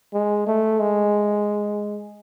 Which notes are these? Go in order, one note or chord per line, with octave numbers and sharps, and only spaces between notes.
G#3
A3
G#3